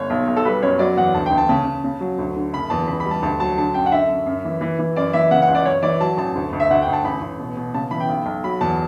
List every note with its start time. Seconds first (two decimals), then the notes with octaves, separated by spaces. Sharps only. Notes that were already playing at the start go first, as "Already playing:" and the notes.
Already playing: G1 C#5
0.10 B1
0.28 B1
0.36 A4
0.45 G3 B4
0.62 F#2 C#5
0.79 F#3 D5
0.97 E2 F#5
1.14 D2 A5
1.26 G5
1.31 D2
1.38 A5
1.49 C#3 A5
1.66 C#3
1.84 C#3
2.00 F#3
2.18 D2
2.36 D3
2.53 F#1 B5
2.70 E2 A5
2.87 C#2 B5
3.00 B5
3.06 G3
3.11 A5
3.22 D2 A5
3.40 F#3 A5
3.58 D3 A5
3.74 F#2 G5
3.86 F#5
3.92 D3 E5
4.09 F#2
4.26 F#2
4.45 E3
4.61 E3
4.79 E3
4.96 F#2 D5
5.13 E3 E5
5.31 C#3 F#5
5.42 F#5
5.48 C#2
5.55 D5
5.65 F#2 C#5
5.82 E3 D5
6.01 F#3 A5
6.17 A1 A5
6.35 D2
6.52 D2
6.60 E5
6.70 D2 F#5
6.82 G5
6.88 D2
6.93 A5
7.04 A1 B5
7.21 A1
7.39 B2
7.57 B2
7.74 C#3 A5
7.91 E3 B5
8.00 G5
8.09 B1
8.26 B1
8.44 F#3 B5
8.61 E2 A5